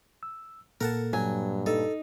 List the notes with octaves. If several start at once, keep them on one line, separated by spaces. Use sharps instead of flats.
E6
A#2 A#3 A4 A#4 F#5 A5
G2 F#3 G#5
D#4 A4